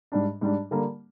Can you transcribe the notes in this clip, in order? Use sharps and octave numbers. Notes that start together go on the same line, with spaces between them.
G#2 G3 D4
G#2 G3 D4
D3 G3 A#3